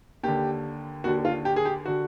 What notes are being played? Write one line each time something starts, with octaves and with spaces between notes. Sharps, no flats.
D#2 D3 G4
D#2 D3 F#4
F4
G4
G#4
G4
D3 F#4